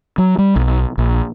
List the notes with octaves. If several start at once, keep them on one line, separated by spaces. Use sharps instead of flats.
F#3
G3
B1
A#1